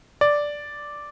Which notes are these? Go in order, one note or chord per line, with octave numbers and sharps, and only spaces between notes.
D5